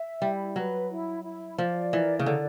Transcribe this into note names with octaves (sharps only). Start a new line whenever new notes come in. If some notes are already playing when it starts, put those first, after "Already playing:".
Already playing: E5
G3 E4
F#3 B4
E4
E4
F3 D5
E3 A#4
C#3
D3 D5